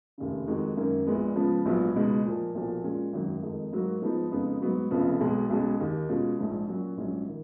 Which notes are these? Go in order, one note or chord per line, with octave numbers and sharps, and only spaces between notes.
F1 D#2 C#3
F2 D#3 G#3 D#4 F#4
G#1 F#2 D#3 A#3 C#4
A#1 A#2 G#3 B3
C#2 C#3 F3 B3
A#1 G#2 F#3 B3 F4
C#2 B2 G#3 D#4
A#2 F3 A#3
B1 A#2 F3
A#2 G#3 C#4 F4
G#1 F#2 D#3 F#3 A#3
F2 D#3 G#3 D#4
G#2 F#3 A#3 D#4 F#4
G#2 F3 G#3 B3 D#4
F2 C#3 G#3 B3 D#4
G#2 F#3 B3 F#4
F1 F2 C#3 F3 B3
B1 B2 G#3
B1 B2 G#3 C#4
D#2 D#3 A#3
B2 G#3 C#4 F4
A#1 G#2 F3
A#2 F#3 C#4 F#4
A#1 G#2 F#3 C#4
D#3